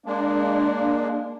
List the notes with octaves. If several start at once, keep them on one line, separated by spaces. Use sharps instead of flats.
G#3 A#3 D4